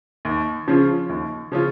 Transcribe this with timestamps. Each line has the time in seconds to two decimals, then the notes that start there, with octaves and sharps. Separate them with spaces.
0.25 D#2
0.68 C#3 F3 C#4 F4
1.09 D#2
1.52 C#3 F3 C#4 F4